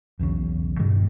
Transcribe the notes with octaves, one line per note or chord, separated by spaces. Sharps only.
E1 B1 E2 C#3
G2 B2 D#3 G#3